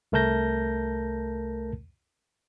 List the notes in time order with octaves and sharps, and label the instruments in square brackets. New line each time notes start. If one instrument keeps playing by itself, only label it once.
[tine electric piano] C2 A3 A#4 A5 G6 A#6